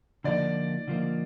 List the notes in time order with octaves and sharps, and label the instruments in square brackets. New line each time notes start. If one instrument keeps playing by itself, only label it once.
[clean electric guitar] D3 F3 A#3 D#4 [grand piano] D5
[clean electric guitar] D3 F3 A#3 D#4